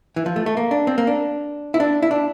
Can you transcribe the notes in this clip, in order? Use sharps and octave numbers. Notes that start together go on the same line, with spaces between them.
E3
F3
A3
A3
A#3
D4
C4
A#3
D4
E4
D4
E4
D4